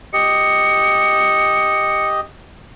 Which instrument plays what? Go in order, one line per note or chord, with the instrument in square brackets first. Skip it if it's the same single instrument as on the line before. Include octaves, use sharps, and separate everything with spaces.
[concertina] G4 D#5 [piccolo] C#7